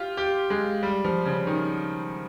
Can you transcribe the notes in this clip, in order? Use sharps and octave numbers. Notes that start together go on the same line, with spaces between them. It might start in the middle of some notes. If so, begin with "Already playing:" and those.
Already playing: F4 G4
G4
G#3
G3
F3
C#3
D#3